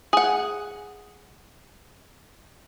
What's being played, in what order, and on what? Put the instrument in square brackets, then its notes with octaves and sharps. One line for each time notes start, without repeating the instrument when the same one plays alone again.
[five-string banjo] G#4 F#5